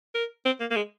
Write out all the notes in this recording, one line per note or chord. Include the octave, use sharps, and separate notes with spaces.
A#4
C4
A#3
A#3
G#3